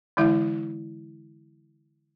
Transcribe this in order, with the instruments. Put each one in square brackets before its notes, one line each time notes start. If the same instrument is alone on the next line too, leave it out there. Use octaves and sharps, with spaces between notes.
[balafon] D3 E3 G#3 E4 E5